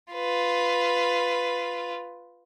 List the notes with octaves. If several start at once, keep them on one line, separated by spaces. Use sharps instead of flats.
F4 B4